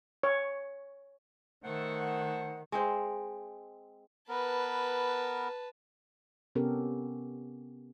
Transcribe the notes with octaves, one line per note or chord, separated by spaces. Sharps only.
C#5
D#3 A3 C5 F#5
G#3 C4 C5
B3 A#4 B4 A5
C3 B3 C#4 G4 A4 A#4